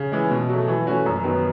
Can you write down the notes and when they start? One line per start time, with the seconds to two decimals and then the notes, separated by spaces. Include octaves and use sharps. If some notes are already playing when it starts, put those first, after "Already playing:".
Already playing: C#3
0.12 E3 G#3
0.31 B2
0.49 F#3 A3
0.68 E3
0.87 A3 C#4 F#4
1.06 F#2
1.24 D#3 F#3 B3